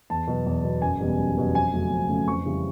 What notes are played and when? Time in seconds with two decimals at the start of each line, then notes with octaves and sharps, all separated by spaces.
0.10 E2 A5
0.27 B2 F#3 B3
0.46 E2
0.64 B2 F#3 B3
0.82 F#1 G#5
1.00 E2 B2 G3 B3
1.19 F#1
1.37 E2 B2 G3 B3
1.54 F2 G#5
1.72 C#3 F#3 A3
1.90 F2
2.09 C#3 F#3 A3
2.27 F2 C#6
2.45 C#3 E3 G3